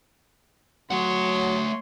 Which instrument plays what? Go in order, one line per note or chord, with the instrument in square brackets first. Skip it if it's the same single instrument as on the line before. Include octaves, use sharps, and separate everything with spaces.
[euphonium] F#3 [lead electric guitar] A3 F#5 [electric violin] C#5 C6